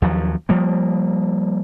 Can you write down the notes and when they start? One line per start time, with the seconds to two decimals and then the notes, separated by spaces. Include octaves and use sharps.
0.02 D#2 F3 F#3
0.49 F3 G3 A#3